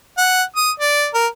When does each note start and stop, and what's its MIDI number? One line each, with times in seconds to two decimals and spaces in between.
0.18 0.42 78
0.57 0.71 87
0.80 1.08 74
1.14 1.27 70